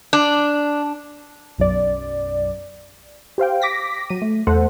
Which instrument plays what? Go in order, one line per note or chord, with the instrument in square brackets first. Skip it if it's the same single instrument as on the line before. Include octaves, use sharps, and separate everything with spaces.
[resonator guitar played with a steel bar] D4
[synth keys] B1 F#2 D5
[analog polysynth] G4 C5 F5 G5
D6 A#6 B6
F#3 D#7
A3
E2 A3 A4 C5 F#5